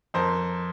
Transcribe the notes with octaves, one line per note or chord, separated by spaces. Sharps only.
F2 A#4 C5